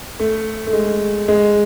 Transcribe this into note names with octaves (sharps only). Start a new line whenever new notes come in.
A3
A3
G#3
G#3